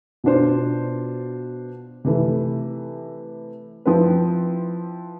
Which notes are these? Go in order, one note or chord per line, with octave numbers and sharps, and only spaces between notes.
B2 B3 D4 F4 C5
C3 E3 A3 E4
F3 C4 E4 B4